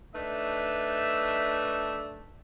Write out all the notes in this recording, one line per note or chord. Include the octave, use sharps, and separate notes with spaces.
A3 D4 D#4 B4 E5